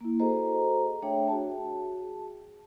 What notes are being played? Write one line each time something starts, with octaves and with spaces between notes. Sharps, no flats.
A#3 E4
F#4 G#4 A4 C5 D#5 A#5
A3 D4 G#4 C#5 E5 G5
F#4 G#4 A5